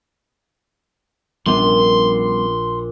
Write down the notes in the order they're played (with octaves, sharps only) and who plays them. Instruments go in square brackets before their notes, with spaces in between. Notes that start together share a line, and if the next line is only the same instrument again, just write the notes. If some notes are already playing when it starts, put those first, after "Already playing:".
[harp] A#1 [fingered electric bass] G3 B3 C#4 [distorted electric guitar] C6